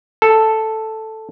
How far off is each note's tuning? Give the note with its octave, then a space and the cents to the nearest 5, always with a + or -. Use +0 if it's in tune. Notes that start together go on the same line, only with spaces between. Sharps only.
A4 +0